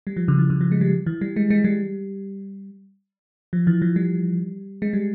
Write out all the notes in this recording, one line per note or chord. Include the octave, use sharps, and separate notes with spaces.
G3
F3
C#3
E3
C#3
F3
G#3
G3
E3
G3
G#3
G#3
G3
F3
E3
F3
G3
G#3
G3